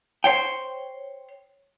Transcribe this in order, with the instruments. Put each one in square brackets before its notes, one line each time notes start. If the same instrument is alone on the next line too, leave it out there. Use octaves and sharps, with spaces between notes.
[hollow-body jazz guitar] C5 C#5 G5